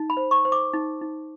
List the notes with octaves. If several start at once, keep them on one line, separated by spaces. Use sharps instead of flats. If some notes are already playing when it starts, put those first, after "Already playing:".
Already playing: D#4
B5
C5
C#6
C5
D6
D#4
D#4